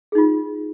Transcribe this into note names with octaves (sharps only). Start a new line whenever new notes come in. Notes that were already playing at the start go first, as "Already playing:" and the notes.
D#4 F4 G#4